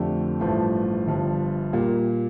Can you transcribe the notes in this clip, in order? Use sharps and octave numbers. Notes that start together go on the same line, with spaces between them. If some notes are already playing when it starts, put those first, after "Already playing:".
Already playing: F2 D3 A3 D4 G4
A1 G2 F3 A3
G1 G2 F3
A#2 G3 A#3